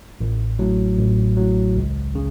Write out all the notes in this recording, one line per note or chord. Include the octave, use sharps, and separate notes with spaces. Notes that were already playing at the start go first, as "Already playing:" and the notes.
A1
A2 F#3
A1
A2 F#3
C#2
C#3